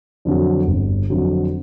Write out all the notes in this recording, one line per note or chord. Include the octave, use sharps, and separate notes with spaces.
F2 D3 F#3
G1
F2 D3 F#3